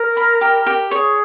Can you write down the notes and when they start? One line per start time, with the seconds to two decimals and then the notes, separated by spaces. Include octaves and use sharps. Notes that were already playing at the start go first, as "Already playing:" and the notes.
Already playing: A#4
0.17 B5
0.41 G4
0.66 G4
0.91 G#4 C#5